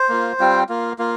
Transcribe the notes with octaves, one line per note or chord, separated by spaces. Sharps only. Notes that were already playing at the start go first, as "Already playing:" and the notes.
Already playing: C5
A#3 F4
G3 C4 F4
A#3 F4
A#3 F4